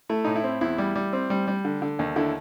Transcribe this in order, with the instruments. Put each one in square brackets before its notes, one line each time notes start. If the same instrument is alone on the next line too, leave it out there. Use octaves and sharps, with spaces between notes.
[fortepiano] A3 E4
A2 D#4
E4
C4
E2 E4
G3
G3
C4
G3
G3
D3
D3
D#2
D3 E4